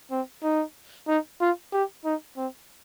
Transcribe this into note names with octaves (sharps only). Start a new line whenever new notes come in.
C4
D#4
D#4
F4
G4
D#4
C4